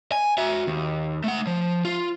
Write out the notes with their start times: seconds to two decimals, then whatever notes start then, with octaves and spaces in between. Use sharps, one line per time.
0.12 G#5
0.38 F#4 E5
0.67 D#2
1.24 A3 F#5
1.47 F3
1.85 F4